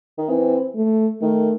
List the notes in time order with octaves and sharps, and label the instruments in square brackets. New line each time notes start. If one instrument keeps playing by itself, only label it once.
[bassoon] D#3
[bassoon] E3 [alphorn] C4
[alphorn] A3
[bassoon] D#3 [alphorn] A3